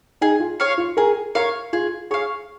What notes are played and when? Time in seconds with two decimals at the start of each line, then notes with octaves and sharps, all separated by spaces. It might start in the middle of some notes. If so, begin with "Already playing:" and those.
0.21 D#4 G#4
0.40 F4
0.60 C#5 F5
0.78 F4
0.97 G#4 A#4
1.35 A#4 C#5 F5
1.73 F4 G#4
2.11 G#4 C#5 F5